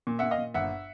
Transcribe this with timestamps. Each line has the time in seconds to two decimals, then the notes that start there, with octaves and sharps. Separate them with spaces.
0.07 A#2
0.19 A#2 E5 F#5
0.31 D#5 F5
0.39 A#2
0.54 G1 E5 F#5